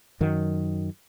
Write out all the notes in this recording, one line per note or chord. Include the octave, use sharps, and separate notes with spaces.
F#2 D#3 F#3